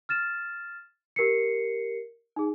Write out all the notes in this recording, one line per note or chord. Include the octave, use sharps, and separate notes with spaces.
F6 A6 E7
G4 A#4 C7 C#7
D#4 G#4